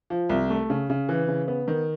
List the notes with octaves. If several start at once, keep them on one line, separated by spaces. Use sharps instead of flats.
F3
C2
A3
C#3
C#3
E3
C#3
B3
D#3